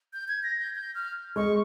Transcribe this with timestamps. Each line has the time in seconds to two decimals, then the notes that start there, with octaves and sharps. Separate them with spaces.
0.13 G6
0.28 G#6
0.43 A#6
0.60 G6
0.75 G6
0.95 F6
1.36 G#3 C#6